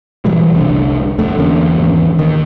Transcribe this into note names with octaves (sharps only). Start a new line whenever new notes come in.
B2 E3 G3 G#3
F1 C2 A2 D3
F2 A3
E2 D3 A#3 C#4
G#1 E2
D#2 D#3